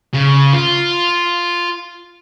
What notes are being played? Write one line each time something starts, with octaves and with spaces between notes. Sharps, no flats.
C#3
F4